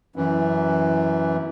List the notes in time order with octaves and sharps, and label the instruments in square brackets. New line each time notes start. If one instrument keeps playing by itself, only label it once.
[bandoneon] F#2 E3